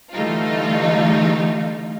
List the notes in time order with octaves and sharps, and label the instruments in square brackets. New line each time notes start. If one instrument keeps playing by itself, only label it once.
[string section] D3 E3 G3 A3 D#4 F4